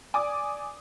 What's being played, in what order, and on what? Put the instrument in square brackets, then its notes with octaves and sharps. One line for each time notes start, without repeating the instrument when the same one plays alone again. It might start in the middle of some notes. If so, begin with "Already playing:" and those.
[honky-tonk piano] D5 G#5 D6 D#6